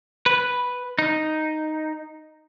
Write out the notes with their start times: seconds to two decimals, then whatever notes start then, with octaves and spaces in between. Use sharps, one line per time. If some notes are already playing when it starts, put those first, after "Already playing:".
0.26 B4
0.99 D#4